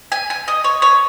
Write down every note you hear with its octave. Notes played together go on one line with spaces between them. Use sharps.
G#5
G#5
D#5
C#5
C#5